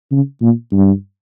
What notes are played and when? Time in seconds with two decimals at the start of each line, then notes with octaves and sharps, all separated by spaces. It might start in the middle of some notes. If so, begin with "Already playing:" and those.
0.12 C#3
0.41 A#2
0.72 G2